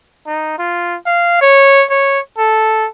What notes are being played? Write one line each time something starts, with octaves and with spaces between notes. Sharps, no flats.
D#4
F4
F5
C#5
C#5
A4